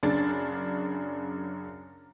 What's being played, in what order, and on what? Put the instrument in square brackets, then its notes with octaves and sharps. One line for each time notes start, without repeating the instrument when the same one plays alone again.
[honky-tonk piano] F#2 C#3 D4 A6